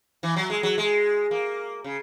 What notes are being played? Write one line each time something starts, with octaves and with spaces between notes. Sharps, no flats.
E3
F#3
G#3
F#3
G#3
A#3
C#3